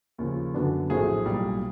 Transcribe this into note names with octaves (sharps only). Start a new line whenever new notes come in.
D#2 C#3 F3
F#2 D3 F#3 B3 D4
A#1 A2 F#3 A3 C4 G#4
B1 A#2 G3